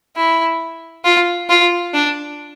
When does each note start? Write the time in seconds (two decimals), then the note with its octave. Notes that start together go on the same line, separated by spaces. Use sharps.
0.17 E4
1.05 F4
1.49 F4
1.94 D4